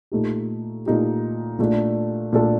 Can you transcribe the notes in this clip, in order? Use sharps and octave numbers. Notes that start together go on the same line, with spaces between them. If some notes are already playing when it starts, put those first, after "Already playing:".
A#2 A3 D#4 G4
A#2 A3 D#4 G4
A#2 A3 D4 A4
A#2 A3 D4 A4